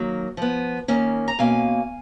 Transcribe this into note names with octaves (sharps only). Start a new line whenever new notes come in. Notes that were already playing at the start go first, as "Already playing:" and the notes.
Already playing: D#3 F#3 A#3
F3 B3
D#3 A#3 C#4
A#5
B2 A#3 C#4 F5 G#5